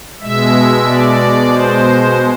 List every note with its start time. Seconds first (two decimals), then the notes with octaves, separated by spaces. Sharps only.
0.21 B2 G#3 E5
0.86 D5
1.51 C5